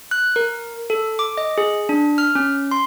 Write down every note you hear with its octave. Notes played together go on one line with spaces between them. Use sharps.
F#6
A#4
A4
D6
D#5
G#4
D4
F6
C#4
C6